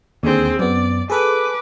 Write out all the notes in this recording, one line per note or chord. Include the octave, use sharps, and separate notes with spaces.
D#2 D3 C4 G#4
F#2 B3 D5
G#4 A4 B4 D6